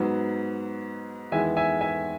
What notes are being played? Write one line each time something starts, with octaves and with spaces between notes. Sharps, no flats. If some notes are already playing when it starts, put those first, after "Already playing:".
Already playing: G#2 F#3 B3
E2 D#3 G#3 B3 E5 G#5
E5 G#5
E5 G#5